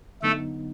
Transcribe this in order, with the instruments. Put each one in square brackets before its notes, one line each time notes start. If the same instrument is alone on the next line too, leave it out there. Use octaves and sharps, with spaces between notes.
[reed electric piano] F#2 D3 F#3 B3 D#4 [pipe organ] A3 A4